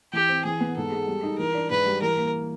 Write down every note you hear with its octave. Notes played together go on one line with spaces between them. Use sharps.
E3 G4
C4
E3 G#4
B3
G#2 A4
G#3
G3
D#4
E3 A#4
D4
G#2 B4
G3
E3 A#4
A#3